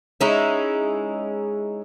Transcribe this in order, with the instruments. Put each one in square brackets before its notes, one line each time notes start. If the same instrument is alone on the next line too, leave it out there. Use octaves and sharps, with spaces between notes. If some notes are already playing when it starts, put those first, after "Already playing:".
[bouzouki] G#3 C#4 D#4 E4